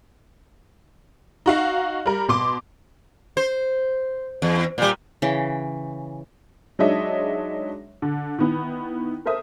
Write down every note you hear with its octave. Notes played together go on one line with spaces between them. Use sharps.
D#4 F#4 F5
G3 A#4
B2 C6 D6
C5
E2
A#2 G3
C#3 E3 G5
F#3 G#3 D4 D#4 C#5 E5
D3
D#3 B3 E4
A4 A#4 C5 E5 D#6